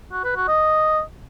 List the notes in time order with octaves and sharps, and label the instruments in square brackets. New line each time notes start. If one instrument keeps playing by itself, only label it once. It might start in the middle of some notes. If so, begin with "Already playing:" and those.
[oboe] F#4
B4
F#4
D#5